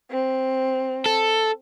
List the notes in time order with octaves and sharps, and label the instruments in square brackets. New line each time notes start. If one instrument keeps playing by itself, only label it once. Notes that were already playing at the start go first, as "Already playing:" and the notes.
[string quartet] C4
[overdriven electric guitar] A4